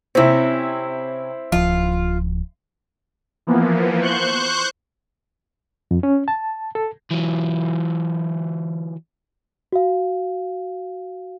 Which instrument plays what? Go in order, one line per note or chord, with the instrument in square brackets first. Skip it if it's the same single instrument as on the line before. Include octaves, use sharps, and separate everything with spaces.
[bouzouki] C3 C#4 [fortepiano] C4 E4
[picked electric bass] D1 F3 [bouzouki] F4
[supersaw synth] E3 F3 A#3 B3
C5 C#6 F#6 G6
[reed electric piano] F2
C#4
A5
A4
[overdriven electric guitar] E3 F#3
[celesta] F#4 F5